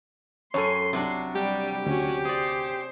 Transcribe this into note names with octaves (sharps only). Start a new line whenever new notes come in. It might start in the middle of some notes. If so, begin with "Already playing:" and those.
F#2 C#4 A4 C#5 G#5 C6
C2 C3 F#3 D4
G3 G4
D2 C#4 F#4
G#4 C5 D5